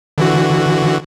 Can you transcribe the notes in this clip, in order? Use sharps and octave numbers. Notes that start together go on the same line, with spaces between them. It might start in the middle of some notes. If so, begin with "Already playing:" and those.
D3 E3 F#4